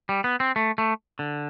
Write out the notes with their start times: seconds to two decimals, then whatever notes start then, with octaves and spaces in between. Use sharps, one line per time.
0.09 G3
0.24 B3
0.40 C4
0.56 A3
0.78 A3
1.19 D3